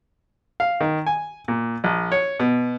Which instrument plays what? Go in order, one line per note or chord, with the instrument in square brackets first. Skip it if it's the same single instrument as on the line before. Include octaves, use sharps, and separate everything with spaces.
[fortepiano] F5
D#3
G#5
A#2
A#1
C#5
B2